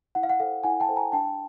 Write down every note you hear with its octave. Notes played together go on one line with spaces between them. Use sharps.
E4 F#5
F5
F#5
A4 C5 F5 G5
E4 F#5 G#5
G5 A5
A4 C5
G#5 A#5
D4 G5 A5